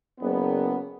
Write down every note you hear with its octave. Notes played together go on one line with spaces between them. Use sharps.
F#1 B3